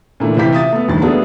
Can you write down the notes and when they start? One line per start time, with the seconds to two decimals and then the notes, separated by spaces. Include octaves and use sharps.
0.20 A#2 D3 E3 A3 A#3
0.37 C3 E3 F4 F5 G6 B6
0.53 E5 D#6 A6
0.72 A3 B3
0.88 E1 D2 G2 D#3 A6
1.02 A3 B3 D4 F4 F#4 G#4